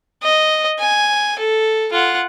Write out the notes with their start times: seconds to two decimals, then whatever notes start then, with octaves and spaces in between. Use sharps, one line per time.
0.23 D#5
0.80 G#5
1.39 A4
1.92 F4 F#5